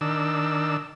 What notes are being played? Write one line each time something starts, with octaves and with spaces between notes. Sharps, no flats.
D#3 D4 E6